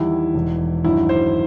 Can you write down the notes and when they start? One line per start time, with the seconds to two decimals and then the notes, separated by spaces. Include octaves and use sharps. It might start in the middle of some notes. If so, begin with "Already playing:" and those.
Already playing: E2 D#3 G3 E4
0.34 E1 E2 D#3
0.84 A1 G2 D#3 F#3 E4
1.09 C5